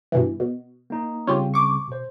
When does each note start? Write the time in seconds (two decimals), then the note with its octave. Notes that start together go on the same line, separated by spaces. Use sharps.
0.12 G2 B2 E3
0.40 B2
0.90 A#3 D#4
1.27 C#3 G3 C4 C#4 F4 G4
1.54 C#6 D6
1.88 B2 C5